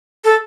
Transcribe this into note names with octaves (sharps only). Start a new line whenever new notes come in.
A4